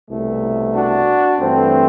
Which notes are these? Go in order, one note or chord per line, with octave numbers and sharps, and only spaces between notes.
C2 B2 A3
D4 F#4
G2 E3 A3 C4